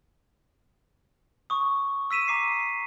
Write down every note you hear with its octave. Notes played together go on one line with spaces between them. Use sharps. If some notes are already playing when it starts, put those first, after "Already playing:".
C#6 D#6
E6 B6 D#7 E7
A#5 D6 C7